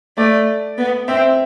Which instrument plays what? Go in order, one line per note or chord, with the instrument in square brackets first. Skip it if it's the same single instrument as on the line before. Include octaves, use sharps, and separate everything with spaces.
[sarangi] A3 [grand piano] D5
[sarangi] B3
[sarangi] C4 [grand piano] E5